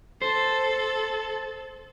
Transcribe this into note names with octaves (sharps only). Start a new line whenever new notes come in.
A4 C5